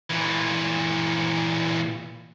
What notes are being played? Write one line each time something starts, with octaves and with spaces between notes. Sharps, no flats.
A#2 E3